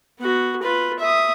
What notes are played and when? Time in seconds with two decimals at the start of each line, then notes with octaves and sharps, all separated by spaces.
0.20 B3 F#4
0.63 F4 B4
1.00 E5 D#6